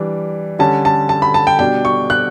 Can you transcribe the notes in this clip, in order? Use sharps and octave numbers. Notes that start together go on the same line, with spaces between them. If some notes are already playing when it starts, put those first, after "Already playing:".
Already playing: E3 G3 D4
D3 G3 C#4 A5
A5
A5
B5
A5
G5
B2 G3 D4 G5
C#6
F#6